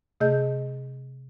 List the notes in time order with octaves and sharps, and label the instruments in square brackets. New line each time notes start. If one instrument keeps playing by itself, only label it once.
[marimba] C3 A3 G#4 D#5 G6